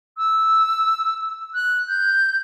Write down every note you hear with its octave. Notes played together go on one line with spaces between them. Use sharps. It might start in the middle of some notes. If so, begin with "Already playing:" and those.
E6
F#6
G6